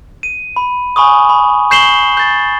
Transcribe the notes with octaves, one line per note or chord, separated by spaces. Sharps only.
D#7
B5
G#5 B5 C#6 D#6
B5
C#6 G6 C7 E7 F#7 G7
G6 A6